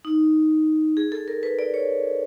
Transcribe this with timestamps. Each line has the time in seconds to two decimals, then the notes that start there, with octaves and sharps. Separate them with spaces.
0.05 D#4
0.97 G#4
1.12 A4
1.28 A#4
1.43 B4
1.59 D5
1.74 C#5